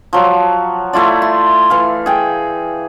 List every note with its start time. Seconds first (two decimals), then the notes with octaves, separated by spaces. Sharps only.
0.13 F3 F#3
0.93 A3 E4 F4 D5
1.22 C6
1.70 E3 F5
2.06 G#4 G5